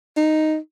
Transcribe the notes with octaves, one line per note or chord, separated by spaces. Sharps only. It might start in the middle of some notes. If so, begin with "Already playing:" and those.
D#4